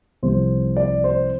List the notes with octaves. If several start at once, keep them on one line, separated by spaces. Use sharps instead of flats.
C2 C3 F3 C4 C5
D5
C5